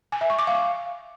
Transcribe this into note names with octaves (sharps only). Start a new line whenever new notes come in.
G#5
E5
C#6
D6
F5